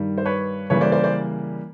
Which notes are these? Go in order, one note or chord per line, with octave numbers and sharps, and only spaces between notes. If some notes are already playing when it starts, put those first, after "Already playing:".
Already playing: G2 D#3 G3
C5
B4 C#5
C#3 E3 G3 A#3 B4 C#5
C5 D5
C5 D5
C5 D5